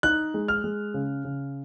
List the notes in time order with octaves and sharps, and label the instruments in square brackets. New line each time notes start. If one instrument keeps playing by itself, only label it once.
[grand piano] D#4 F#6
G#3
F6
G#3
C#3
C#3